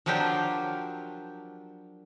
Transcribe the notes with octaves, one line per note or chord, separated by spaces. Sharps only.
F3 F#3 D4 G4 A#4 C5